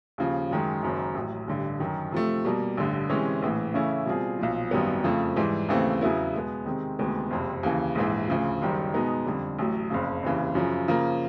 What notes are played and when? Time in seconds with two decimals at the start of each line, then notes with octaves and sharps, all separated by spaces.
0.18 D#2 C#3 F3
0.51 F#2 D#3 G#3
0.83 F#1 F#2 D#3
1.15 A1 A2 F#3
1.48 A1 G2 D3
1.80 F#2 D#3 F#3
2.12 C3 F3 A3
2.45 B2 G3 A#3
2.77 A1 G2 D3
3.09 C3 E3 G#3 C#4
3.42 A#1 A2 E3
3.74 C#3 E3 A3 C#4 E4
4.06 B2 G3 C4 F4 G#4
4.39 B1 A#2 F3
4.71 G#1 F#2 D#3 G3 B3
5.04 F2 C#3 F3 A3
5.36 G#2 E3 G3
5.69 D#2 C#3 E3 A3 C4
6.01 E2 C#3 F#3 B3 E4
6.34 B2 G#3 B3
6.66 C3 D#3 G#3 C4
6.99 D2 C3 D#3 G#3 B3
7.30 F#1 F2 C3
7.63 D#2 C#3 E3
7.95 A#1 G#2 E3
8.28 D2 C#3 F3
8.61 F#1 F#2 D#3 G3
8.94 B2 G#3 B3 D#4
9.26 F2 D3 G3
9.59 A1 A2 F#3
9.90 F#1 F2 C#3
10.23 F1 D#2 C#3 E3
10.55 F#2 C#3 F3
10.88 C#3 F3 A#3